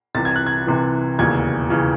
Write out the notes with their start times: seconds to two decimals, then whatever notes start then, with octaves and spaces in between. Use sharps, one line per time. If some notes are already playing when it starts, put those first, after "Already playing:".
0.15 C2 C3 E3 A6
0.25 G#6
0.36 F#6
0.46 G#6
0.67 C2 C3 E3
1.18 E1 D#2 C#3 E3 G#6
1.70 C#3 E3